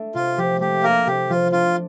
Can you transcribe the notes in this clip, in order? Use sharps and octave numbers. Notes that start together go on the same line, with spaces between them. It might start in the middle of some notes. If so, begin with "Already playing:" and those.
Already playing: A3 D4
C3 F4
F3 G4
A3 G4
A#3 D4 A#4
C3 G4
F3 F4
D4 F4